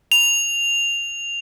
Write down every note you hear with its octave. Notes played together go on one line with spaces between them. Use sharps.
F7